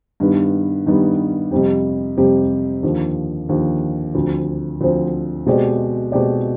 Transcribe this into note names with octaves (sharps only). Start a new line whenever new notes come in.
G2 D#3 G3 B3
G2 D#3 G3 B3
F2 C3 G3 C4 G4
F2 C3 G3 C4 G4
D#2 D3 F3
D#2 D3 F3
D2 D3 F3 C4
D2 D3 F3 C4
B2 G#3 C4 G4 D5
B2 G#3 C4 G4 D5